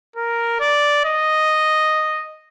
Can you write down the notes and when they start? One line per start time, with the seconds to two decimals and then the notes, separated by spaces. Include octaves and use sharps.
0.16 A#4
0.60 D5
1.05 D#5